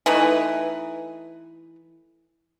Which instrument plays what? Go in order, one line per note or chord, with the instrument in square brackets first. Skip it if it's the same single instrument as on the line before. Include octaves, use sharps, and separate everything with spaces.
[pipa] E3 A3 D#4 B4